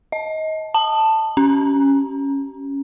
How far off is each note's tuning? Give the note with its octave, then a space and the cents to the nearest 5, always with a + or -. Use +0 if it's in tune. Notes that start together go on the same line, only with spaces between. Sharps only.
D#5 +20
A5 +10
C#4 +5